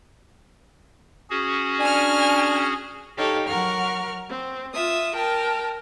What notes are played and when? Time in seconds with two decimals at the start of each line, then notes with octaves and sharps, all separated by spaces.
1.30 C#4 F#4 G#4
1.80 D4 G#5 F6
3.17 D#4 G4 A4 C#5 F5
3.47 F#3 A#4 F#5 C#6 F6
4.29 C4
4.73 F4 E5 D#6
5.15 A#4 G5 A5